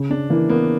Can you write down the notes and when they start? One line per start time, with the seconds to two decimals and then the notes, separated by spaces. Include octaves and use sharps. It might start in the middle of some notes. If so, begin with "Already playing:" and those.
Already playing: C#3
0.10 C#3 D4
0.30 E3 A#3
0.49 A#3 B3